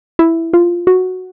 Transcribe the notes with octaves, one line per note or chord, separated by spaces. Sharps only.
E4
F4
F#4